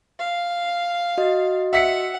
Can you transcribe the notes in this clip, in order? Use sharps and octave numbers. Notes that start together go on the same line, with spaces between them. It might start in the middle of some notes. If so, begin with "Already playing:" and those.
F5
F#4 D#5 A6
E5 F#5 B6 C#7